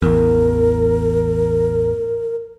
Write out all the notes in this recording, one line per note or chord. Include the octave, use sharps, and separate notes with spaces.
A1 E2 A#4